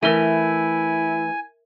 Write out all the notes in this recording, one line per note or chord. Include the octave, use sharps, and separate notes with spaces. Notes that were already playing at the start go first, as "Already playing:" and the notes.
E3 A3 E4 A#4 E5 G#5 D#7